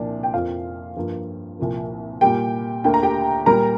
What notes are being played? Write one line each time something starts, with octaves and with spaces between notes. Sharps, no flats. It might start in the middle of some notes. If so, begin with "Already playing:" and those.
Already playing: C2 A#2 F3 A#3 D4
G5
F2 F3 A#3 F4 F5
G2 F3 A#3
C2 A#2 F3 A#3
A#2 G3 A#3 G4 G5
D2 D3 A#3 G5
A#5
G4 G5
A#2 G3 A#3 A#4 A#5